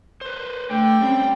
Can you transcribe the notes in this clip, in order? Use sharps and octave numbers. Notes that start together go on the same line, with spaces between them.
B4 C5
D3 A3 G5
G3 C4 C#4